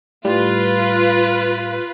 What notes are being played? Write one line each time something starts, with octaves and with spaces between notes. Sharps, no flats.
A2 G3 F4 B4